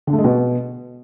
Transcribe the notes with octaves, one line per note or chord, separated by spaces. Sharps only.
D3
A3
G#3
B2